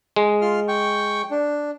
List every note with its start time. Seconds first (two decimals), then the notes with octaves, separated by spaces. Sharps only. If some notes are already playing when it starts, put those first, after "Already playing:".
0.16 G#3
0.41 F4 C6 F6
0.68 G5 C#6
1.31 D4